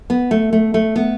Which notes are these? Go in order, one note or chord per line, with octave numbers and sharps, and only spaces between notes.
B3
A3
A3
A3
B3